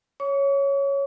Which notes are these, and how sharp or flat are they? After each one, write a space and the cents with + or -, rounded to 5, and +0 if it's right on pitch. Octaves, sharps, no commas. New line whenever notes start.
C#5 +0 C#6 +45